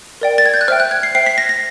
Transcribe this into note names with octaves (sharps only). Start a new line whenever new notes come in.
A#4 D5 G5
A6
G#6
G6
F#6
C5 E5 G5 F6
F#6
G#6
C7
C5 E5 G5 C7
B6
A#6
A#6